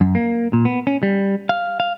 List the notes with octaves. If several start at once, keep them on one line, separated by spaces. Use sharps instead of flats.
F#2
A#3
A#2
B3
C#4
G3
F5
F5